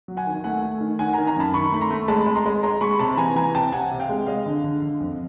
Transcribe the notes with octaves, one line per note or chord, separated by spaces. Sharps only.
F#3
F#5 G#5
D#3
A3 F#5 G#5
A3
D#3
D#3 F#5 G#5
D#3 G#5 A#5
G#5 A#5
F#2 A5 B5
D#3 B5 C#6
A3 B5
A#5 C6
A3
G#3 A5 B5
G#3
A#5 C6
G#3
G#3 A#5 C6
G#3 B5 C#6
C3 A5 B5
E3 G#5 A#5
E3 G#5 A#5
C3 G5 A5
C3 F#5 G#5
C3
F5 G5
G#3
G#3 D#5 F5
D3
D3
D3
F2